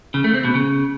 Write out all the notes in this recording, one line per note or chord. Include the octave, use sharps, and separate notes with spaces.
C#3
A3
C4
B2
C#3